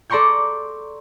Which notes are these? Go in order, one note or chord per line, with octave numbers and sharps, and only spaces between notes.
A4 D5 A#5 C6 C#6 G6